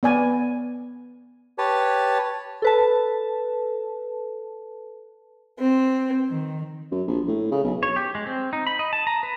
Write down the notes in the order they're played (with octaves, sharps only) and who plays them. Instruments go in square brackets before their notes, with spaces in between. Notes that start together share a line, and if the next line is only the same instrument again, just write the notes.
[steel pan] B3 D5 G#5
[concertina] G4 B4 C#5 A5
[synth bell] A4 B4 A5
[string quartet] C4
D#3
[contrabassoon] F#2
A#1
A2
C#3
B1
[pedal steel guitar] C#5
G4
G#3
C4
D#4
B5
D#5
A5
A#5
B4